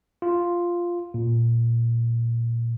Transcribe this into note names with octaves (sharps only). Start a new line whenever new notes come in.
F4
A#2